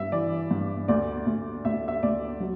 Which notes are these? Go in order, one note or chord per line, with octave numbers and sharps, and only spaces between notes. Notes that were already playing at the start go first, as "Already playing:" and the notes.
Already playing: G2 E5
E3 D5
G2
D2 D5
D2
D2 E5
E5
D2 D5
F#3